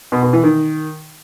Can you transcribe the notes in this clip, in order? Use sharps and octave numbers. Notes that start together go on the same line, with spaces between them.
B2
B2
E3
D#3